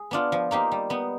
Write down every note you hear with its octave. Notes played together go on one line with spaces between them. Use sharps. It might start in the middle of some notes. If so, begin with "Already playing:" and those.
Already playing: G#4
B3 D4 F4
F3
A#3 D#4 G4 C5
G3
B3 D#4